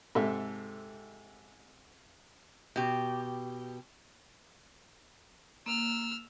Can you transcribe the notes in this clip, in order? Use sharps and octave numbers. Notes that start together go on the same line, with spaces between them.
G#2 C3 A4 E5
B2 G4
A#3 E6 F6